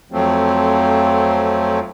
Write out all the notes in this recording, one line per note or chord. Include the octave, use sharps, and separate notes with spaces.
F2 F3 F#3 A3 C4